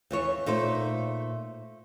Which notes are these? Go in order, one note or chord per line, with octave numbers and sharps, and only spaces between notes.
D#2 E3 C#5
A#2 A3 D#4 C5